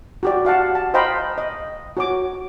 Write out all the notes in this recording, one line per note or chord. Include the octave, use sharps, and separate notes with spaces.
F#4 G4 D5
F#4 F5 F#5 A5
A5
C5 D#5 F5 G5 A#5 B5
D#5
F#4 C#5 D6